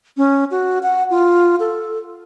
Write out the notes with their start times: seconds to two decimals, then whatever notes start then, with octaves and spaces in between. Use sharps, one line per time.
0.17 C#4
0.51 F#4
0.83 F#5
1.10 F4
1.60 A4